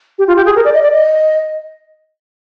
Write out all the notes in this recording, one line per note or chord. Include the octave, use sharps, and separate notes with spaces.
G4
F4
G4
G#4
A#4
D5
D#5
D5
D#5